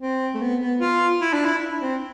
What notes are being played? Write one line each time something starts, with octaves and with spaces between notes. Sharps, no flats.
C4
A3
B3
B3
F4
E4
D4
E4
C4